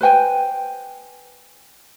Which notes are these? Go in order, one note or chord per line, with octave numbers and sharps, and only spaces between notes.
B4 C5 G5 G#5